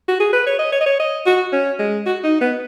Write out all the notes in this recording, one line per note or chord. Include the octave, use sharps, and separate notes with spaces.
F#4
G#4
B4
C#5
D#5
C#5
D#5
C#5
D#5
F#4
C#4
G#3
F#4
D#4
B3